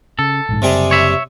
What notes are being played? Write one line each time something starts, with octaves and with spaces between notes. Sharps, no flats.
C#3 A4
A#1 G#2
F#1 C3 G3 G#4
C#5 E5